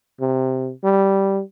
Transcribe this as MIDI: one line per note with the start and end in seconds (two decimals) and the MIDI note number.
0.20 0.71 48
0.84 1.41 55